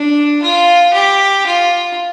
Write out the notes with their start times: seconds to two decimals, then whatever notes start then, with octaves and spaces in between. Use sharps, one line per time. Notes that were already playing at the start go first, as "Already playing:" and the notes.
Already playing: D4
0.42 F4
0.93 G4
1.46 F4